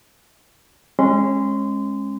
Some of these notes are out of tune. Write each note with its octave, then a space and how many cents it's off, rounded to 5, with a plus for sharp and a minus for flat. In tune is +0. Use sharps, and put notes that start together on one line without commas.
G#3 +0 C#4 -30 C6 -25